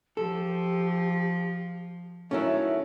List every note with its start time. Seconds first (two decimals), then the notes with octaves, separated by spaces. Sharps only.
0.17 F3 G4 A4
2.31 D#3 F#3 A3 C#4 E4 E5